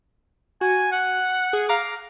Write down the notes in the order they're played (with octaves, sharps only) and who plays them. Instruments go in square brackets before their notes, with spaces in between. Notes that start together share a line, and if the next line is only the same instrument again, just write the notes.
[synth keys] F#4 [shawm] G#5
[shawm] F#5
[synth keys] G#4
F5 A#5 D6